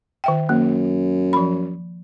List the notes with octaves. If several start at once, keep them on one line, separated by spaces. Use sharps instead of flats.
D#3 E5 G5
F#2 A#3
F3 B5